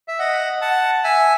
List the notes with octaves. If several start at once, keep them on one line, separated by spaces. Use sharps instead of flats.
E5
D#5 F#5
F#5 A5
E5 G#5